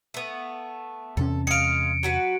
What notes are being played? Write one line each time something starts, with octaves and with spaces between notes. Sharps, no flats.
A3 B3
E2 C3 C#4 A4
G#3 F5 C#7 D7
F#3 F#4 B4